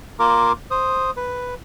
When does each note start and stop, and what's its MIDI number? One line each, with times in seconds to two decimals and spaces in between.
0.19 0.52 58
0.19 0.52 65
0.19 0.52 70
0.19 0.52 86
0.71 1.11 72
0.71 1.11 87
1.17 1.55 71